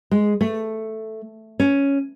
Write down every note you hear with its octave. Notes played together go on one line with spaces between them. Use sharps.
G#3
A3
C#4